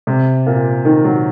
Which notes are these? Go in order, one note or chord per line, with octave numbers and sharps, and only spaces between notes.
C3
A#2
D#3
F#3